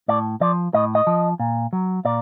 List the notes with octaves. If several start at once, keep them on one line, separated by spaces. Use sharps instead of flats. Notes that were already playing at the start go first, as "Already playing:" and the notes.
A2 D5
F3 D5
A2 D#5
D#5
F3
A#2
F#3
A#2 D5